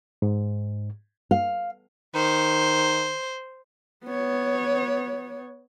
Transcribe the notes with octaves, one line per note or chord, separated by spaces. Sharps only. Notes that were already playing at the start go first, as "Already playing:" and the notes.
G#2
F5
D#3 C5
B3 C#5